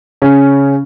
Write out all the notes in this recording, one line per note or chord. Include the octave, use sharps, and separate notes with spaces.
C#3 C#4